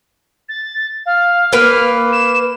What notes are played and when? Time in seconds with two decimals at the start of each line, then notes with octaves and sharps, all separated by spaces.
0.48 A6
1.05 F5
1.53 A#3 B4 F6
2.12 E7